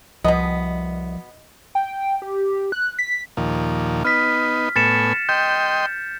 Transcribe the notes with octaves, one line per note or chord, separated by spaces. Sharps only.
C2 B2 F3 B3 D#5
G5
G4
F#6
B6
D#2 A#2 F3
B3 D#4 F6 B6
A2 B3 G#5 A6 C#7 E7
D#5 G5 C6 G6